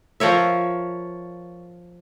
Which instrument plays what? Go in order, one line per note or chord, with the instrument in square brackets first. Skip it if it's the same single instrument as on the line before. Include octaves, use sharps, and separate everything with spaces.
[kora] F3 A#4 C#5 E5